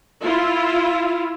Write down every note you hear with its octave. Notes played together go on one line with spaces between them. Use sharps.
E4 F4